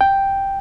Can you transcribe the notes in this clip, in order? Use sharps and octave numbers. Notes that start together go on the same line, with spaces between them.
G5